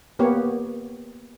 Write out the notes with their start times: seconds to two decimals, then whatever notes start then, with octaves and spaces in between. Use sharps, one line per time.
0.19 A#3 B3 G4 C#5